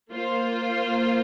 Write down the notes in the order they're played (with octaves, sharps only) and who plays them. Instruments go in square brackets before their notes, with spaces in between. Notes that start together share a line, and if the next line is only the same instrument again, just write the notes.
[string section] A#3 F4 C5